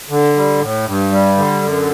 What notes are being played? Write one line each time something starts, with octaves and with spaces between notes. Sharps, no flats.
D3
G3
A2
G2
G3
D3
F#2